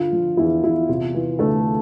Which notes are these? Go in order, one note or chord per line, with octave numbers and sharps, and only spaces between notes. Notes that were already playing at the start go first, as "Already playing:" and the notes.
Already playing: G2 D3 F4
F3
E2 E4
E2 E4
C3 F4
E3
D2 A3 A4